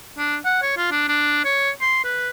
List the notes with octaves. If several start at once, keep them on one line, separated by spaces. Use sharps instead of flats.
D4
F#5
C#5
F4
D4
D4
C#5
C6
B4